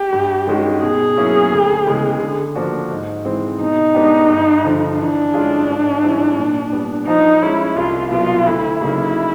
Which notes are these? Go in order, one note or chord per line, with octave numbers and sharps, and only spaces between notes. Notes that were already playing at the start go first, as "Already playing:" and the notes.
Already playing: G4
G2
D#3 G#3 C#4 F#4
B2 G#4
F#3 A#3 C#4 E4
D2
C#3 E3 G#3 B3
D3
F3 A#3 D4 F#4
G#2
E3 G#3 C4
B2 D#4
G#3 B3 D4 G4
G2
D3 F3
E3 D4
G#3 C#4 F4 G#4
G#2
E3 G3 C4 E4
A#2
G3 B3
F3 D#4
G#3 C#4 E4
C2 F4
B2 F#3 B3 F4
D2 E4
C#3 F#3 A#3 D#4